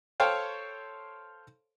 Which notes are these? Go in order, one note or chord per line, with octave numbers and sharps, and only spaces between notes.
A4 C5 C#5 F5 G5